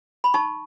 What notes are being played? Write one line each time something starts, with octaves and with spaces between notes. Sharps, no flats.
B5
D#4 A5 C#6